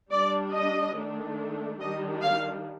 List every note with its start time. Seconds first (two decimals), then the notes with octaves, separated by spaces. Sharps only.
0.11 G3 D4 D5
0.53 D#5
0.95 D#3 A3 D4
1.80 D#3 G3 D4 D#5
2.22 F5